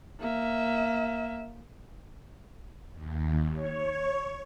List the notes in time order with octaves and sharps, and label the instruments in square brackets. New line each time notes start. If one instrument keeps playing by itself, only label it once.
[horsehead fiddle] A#3 E5
[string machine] D#2
C#5